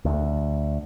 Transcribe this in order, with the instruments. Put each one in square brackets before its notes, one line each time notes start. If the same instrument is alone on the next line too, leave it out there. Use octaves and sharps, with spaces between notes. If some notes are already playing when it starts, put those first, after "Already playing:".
[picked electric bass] D2